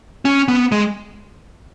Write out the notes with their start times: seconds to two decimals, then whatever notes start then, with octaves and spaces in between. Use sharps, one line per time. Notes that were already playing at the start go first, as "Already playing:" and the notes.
0.25 C#4
0.48 B3
0.72 G#3